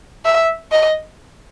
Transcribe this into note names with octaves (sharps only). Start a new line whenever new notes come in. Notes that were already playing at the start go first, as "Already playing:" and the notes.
E5
D#5